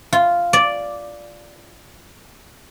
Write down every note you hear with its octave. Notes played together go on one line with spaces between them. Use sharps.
F4
D5